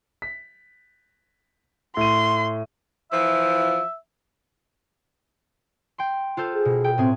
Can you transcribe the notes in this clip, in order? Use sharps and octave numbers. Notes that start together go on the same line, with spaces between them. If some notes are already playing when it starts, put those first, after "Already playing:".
B6
A2 C6 D#7
E3 F3 E5
G5 C6
F4 A4 C5
G#4
B2
G5
A2 C4 G#4